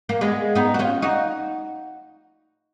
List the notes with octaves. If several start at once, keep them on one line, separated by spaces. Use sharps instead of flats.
A#3
G#3 B3
B3 D#4
F#4
C#4 F4
D#4 F#4